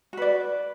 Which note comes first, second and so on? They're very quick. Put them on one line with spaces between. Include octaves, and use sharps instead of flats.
F#4 B4 D5